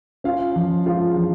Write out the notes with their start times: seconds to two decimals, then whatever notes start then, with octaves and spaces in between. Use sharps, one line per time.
0.24 C#4 F4 F5
0.56 F3
0.86 G#3 F4 F5
1.16 F3